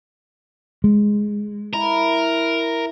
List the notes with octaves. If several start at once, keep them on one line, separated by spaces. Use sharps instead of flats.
G#3
E4 A#4